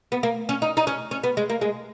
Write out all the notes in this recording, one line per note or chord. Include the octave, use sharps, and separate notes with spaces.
B3
A#3
C#4
D#4
D#4
C#4
C#4
B3
G#3
A#3
G#3